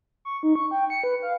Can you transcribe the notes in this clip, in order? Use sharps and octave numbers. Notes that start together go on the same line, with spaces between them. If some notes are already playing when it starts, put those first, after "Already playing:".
C#6
D#4
C#6
G5
C#7
B4
F5